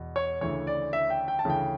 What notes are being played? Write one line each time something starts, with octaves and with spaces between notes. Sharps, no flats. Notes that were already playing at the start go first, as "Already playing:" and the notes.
Already playing: E2 B2
C#5
D2 C#3 E3 C#5
D5
E5
G5
G5
A5
D2 C#3 E3 G5